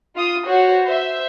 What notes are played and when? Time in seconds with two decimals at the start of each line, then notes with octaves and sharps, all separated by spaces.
0.15 F4 D#6
0.46 F#4 C5 C#5
0.85 C5 E5